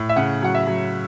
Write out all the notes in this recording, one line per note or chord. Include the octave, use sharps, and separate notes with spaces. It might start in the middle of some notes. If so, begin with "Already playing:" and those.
Already playing: A2
E5
C#3 F#5
F#3 F#5
E5
F#3